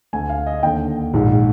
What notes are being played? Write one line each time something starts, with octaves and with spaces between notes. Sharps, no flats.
D2 D3 G#5
F5
D#5
D#2 D3 G5
A#1 G#2 D#3